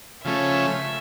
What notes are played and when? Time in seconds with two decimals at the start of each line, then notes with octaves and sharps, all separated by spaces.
0.24 C#3 F3 A3 C#4 E5